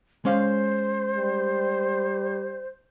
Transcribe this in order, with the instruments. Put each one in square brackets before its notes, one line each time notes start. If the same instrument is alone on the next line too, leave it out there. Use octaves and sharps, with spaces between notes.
[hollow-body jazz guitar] G#3 C#4 F5 [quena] C5
[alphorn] G3